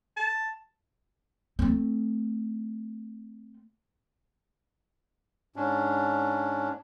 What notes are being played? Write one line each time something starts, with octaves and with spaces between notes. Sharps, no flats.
A5
A3 C4
G#2 C#4 D4